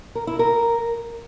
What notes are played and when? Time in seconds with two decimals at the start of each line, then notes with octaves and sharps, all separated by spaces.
0.15 A#4
0.27 E4
0.39 A#4